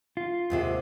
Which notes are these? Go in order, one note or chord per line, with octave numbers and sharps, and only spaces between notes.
F4
D#2 G#2 C3